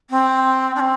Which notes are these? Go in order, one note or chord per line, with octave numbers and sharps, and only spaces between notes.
C4
D4
C4